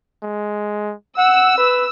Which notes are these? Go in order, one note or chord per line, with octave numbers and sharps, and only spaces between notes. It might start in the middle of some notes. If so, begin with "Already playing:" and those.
G#3
F#5 E6
B4